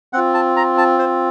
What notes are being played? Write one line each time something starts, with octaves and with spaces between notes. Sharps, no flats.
C4 F4 F#5
A5
A#5
A5
C5